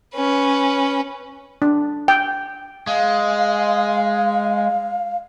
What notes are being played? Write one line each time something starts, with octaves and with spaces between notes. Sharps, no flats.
C#4 B4
D4
G5
G#3 F5